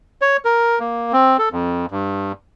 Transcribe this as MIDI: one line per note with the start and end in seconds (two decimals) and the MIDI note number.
0.22 0.37 73
0.45 0.79 70
0.80 1.13 58
1.13 1.37 60
1.38 1.49 69
1.52 1.86 41
1.91 2.32 43